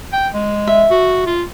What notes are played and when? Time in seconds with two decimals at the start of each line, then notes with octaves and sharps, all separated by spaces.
0.13 G5
0.34 G#3
0.67 E5
0.91 F#4
1.26 F4